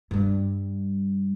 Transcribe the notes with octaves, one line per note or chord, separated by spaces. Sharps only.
G2 G3